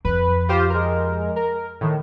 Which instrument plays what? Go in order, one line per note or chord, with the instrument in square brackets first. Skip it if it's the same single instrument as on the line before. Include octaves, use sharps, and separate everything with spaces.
[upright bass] F2 [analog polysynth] B4
[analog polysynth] F4 G4 C5
G#3 A#4
A#4
A2 D#3